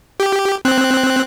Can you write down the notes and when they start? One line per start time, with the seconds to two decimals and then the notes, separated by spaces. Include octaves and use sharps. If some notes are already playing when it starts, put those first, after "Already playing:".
0.20 G4
0.65 C4 F#6